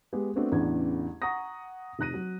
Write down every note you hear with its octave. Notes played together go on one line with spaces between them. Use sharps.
G#3 B3 G4
A3 B3 C4 D4 F#4
A1 E2 C#3 D4 G#6
F#5 A#5 C#6 D#6 A#6
F1 D#4 F#6 A#6 D#7
F#3